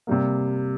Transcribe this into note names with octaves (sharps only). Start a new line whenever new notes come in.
C3 G3 A#3